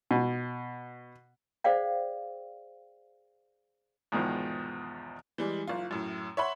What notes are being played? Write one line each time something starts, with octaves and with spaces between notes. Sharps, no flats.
B2
G#4 C5 D5 F5 G5
E2 G#2 B2 D#3 F3
E3 G3 G#3
F#1 F4
F#2 A2
C#5 E5 F#5 B5 C6